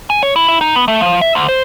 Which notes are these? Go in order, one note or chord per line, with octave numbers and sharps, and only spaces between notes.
G#5
C#5
E4
E4
D#4
B3
A3
F3
E5
D2
C5